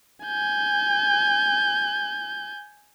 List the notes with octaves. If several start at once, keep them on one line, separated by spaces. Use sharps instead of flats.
G#5 G6